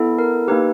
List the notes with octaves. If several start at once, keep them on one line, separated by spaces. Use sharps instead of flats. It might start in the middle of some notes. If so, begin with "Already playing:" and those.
Already playing: B3 E4 A4
A#4
A#3 D#4 G4 B4